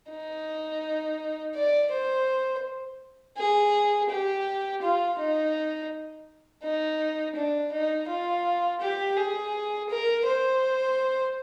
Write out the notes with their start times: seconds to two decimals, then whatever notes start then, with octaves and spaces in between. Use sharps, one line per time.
0.11 D#4
1.55 D5
1.92 C5
3.37 G#4
4.10 G4
4.82 F4
5.18 D#4
6.63 D#4
7.36 D4
7.72 D#4
8.09 F4
8.81 G4
9.17 G#4
9.90 A#4
10.26 C5